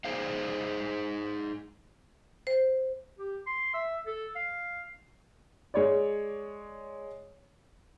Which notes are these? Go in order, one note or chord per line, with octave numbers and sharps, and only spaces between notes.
D#4 G#4 C5 F5
C5
G4
C6
E5
A4
F5
G#3 C#5 D5